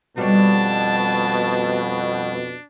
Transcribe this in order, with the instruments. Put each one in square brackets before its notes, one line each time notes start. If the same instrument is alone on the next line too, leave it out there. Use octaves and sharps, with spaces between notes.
[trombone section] F2 B2 [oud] G3 C#5 [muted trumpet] D4 [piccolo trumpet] A5